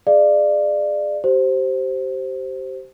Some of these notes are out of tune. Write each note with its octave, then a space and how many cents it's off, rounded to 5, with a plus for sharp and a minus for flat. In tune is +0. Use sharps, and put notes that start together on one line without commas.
G#4 +0 D5 +20 F5 -25
G4 -30 C5 +0